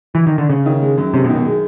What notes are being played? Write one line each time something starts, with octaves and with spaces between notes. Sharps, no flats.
E3
D#3
D3
C#3 C#4
D#3
G#3
F#2
C3 C#4
B2
D#3
B2
G#3